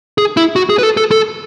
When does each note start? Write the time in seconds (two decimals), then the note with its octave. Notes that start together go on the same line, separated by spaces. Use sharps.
0.18 G#4
0.37 E4
0.56 F#4
0.70 G#4
0.79 B4
0.83 A4
0.97 A4
1.11 A4